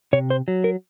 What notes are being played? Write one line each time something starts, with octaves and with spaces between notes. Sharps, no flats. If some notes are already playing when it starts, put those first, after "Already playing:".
C3 C#5
C5
F#3
A#4